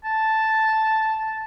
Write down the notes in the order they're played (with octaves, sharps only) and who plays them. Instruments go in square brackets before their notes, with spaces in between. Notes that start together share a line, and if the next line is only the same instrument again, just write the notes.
[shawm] A5